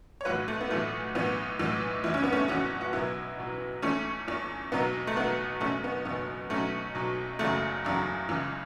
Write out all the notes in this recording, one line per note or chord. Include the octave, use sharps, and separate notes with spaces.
C#5
B1 A2 E3 F#4 B4
A3
B3
B1 A2 E3 A3
B1 A2 E3 B3
B1 A2 E3
F#1 E2 E3 E4
C#4
B3
A3 C#4
F#1 E2 E3 C#4 F#4
F#4
B1 B2 F#3 B3 E4
B1 B2 F#3
E2 E3 A3 C#4
E2 E3
B1 B2 F#3 B3
A3
B1 B2 F#3 B3
F#1 E2 B2 A3 C#4
B3
F#1 E2 B2 B3
B1 B2 F#3 A3 C#4
B1 B2 F#3
F#1 E2 C#3 F#3 A3
F#1 E2 C#3 F#3
C#2 C#3 E3